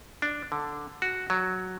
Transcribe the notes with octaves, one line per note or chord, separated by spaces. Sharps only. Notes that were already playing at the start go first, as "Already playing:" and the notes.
D4
D3
F#4
F#3